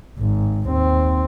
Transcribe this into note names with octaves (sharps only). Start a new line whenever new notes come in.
G#1
D#2 C4